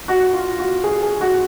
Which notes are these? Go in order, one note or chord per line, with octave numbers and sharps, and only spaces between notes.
F#4
F4
F#4
G#4
G#4
F#4